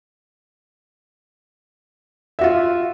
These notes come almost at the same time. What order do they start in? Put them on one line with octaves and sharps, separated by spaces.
E5 F#4 F4